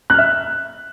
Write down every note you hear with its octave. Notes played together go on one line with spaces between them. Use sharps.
E5 F6 F#6